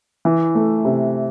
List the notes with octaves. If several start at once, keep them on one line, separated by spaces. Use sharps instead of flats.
E3
A3
C3